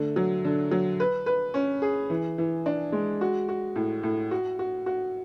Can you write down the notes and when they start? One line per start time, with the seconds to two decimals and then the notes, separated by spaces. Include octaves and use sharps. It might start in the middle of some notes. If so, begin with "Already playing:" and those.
Already playing: D3 A3
0.16 F#3
0.45 D3
0.71 F#3
1.00 B4
1.26 B4
1.54 C#4
1.82 G#4
2.10 E3
2.38 E3
2.66 D4
2.92 G#3
3.21 F#4
3.49 F#4
3.76 A2
4.03 A2
4.31 F#4
4.59 F#4
4.86 F#4